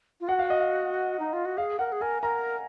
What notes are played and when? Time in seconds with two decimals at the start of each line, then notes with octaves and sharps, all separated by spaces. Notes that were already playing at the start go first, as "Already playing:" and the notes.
0.21 F4
0.28 F#4 F#5
0.39 F5
0.50 D#5
0.60 F5
1.20 D#4
1.33 F4
1.45 F#4
1.57 G#4 F5
1.79 A#4 F#5
1.92 G#4
2.01 A#4 G#5
2.22 A#4 A#5